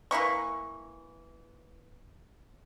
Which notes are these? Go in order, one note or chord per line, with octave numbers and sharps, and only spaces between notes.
E3 A#3 E4 C#6